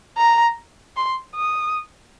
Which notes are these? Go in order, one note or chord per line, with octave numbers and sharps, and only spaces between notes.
A#5
C6
D#6